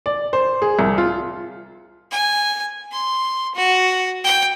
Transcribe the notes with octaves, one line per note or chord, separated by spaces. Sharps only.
D5
C5
G#4
C2
F4
G#5
C6
F#4
G5